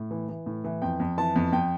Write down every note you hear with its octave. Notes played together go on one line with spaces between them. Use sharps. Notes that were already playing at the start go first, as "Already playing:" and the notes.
Already playing: A2
E3
E3
A2
E3
F2 G5
F2
E3 A5
F2
F2 G5